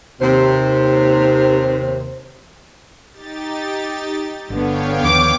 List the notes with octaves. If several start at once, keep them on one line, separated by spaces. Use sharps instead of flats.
D#2 C3 C5
D#4 G4 A6
G1 D3 B3 C#5 F5 G5
D#2 D#3 F3 D6